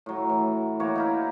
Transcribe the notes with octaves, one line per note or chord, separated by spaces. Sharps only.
A2 F#3
E3
E3 A#3 F#4 C#5
D#4 E4 A#4